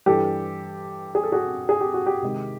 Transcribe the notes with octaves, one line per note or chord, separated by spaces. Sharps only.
G2 E3 G3 G4 A4
G#4
A4
F#4 G#4
G#4
G4
F#4
G4
C3 D#3 G#3